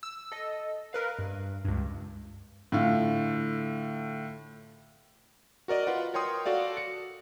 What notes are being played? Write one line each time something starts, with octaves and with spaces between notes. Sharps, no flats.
E6
A4 D#5
A#4 B4 F5
G2
C#2 G2
A2 D3 F4
F#4 A#4 D5 D#5
F4 B4 F#5
A#4 C#5 G5 C6 D#6
F#4 A4 D5 F5
C#7